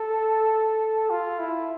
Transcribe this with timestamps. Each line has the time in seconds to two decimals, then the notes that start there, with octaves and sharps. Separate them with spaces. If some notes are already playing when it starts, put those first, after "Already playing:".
Already playing: A4
1.10 F4
1.39 E4